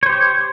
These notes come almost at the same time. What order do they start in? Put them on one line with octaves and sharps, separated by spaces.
C#5 C5 G4